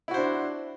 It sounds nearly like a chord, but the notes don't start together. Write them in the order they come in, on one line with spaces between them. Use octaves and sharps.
E4 F#4 C5 D4